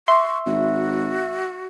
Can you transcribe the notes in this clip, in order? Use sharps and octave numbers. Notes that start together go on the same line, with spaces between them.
E5 C6 C#6
G#1 F#4